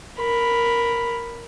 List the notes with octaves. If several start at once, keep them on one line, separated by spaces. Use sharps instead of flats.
A#4 B5